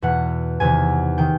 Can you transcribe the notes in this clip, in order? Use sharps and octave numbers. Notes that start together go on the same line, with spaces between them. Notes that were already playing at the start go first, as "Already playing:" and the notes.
E2 B2 F#5
E2 C3 D#3 G#5
D#3 G5